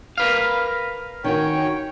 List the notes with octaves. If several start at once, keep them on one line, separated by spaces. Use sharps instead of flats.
A#4 B4 F5
D#3 C#4 F#4 C#5 G5